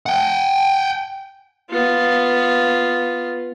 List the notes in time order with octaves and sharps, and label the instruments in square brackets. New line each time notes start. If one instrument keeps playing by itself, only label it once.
[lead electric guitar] F#5 G5
[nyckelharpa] B3 F4